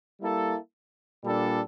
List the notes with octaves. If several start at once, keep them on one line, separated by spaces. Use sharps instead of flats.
G3 A#3 E4 A4
A#2 G3 D4 A4